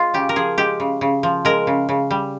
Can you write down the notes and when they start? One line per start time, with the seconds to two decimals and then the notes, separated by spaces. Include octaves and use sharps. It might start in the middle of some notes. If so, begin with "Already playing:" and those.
Already playing: G#3 F4
0.14 C#3 G4
0.29 A#4
0.36 F3 G#4
0.58 G#3 G4
0.80 C#3
1.01 C#3
1.23 F3
1.45 G#3 A#4
1.67 C#3
1.89 C#3
2.11 G3